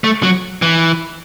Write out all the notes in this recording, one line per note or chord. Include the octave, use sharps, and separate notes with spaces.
A3
F#3
E3